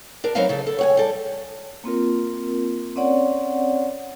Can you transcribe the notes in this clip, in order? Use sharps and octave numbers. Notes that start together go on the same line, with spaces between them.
D4 A#4
F#3 B3 C4 D#4 E5 F5
C#3 A4
A4
C#5 F#5 G#5
G3 A4
A#3 C4 F4 A#4
C4 C#4 C#5 D5 F#5